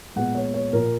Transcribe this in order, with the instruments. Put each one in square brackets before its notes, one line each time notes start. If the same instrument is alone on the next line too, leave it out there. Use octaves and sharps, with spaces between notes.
[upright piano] A#2 G#3 B3 F#5
C#5
C#5
A#2 A#3 A#4